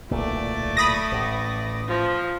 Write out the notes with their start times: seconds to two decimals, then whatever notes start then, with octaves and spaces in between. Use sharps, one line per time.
0.11 D1 B1 A#2 A3 D5
0.77 B5 D#6 A#6
1.12 A1
1.88 F3